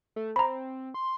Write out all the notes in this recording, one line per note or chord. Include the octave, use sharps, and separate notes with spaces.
A3
C4 A#5 B5
C6